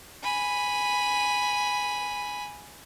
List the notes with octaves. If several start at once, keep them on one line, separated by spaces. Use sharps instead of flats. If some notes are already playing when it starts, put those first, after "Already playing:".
G#5 B5